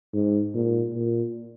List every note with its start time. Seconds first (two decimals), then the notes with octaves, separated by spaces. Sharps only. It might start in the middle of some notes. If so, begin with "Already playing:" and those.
0.14 G#2
0.54 A#2
0.94 A#2